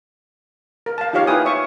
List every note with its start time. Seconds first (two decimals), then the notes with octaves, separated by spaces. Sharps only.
0.86 A#4
0.98 F5 A5
1.13 D#4 F4 G4 C#5 F5
1.27 E4 B4 G5 G#5 D#6
1.45 C#5 E5 C#6